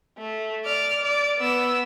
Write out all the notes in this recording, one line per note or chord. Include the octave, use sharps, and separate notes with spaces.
A3
D5 F6
D5
B3 E6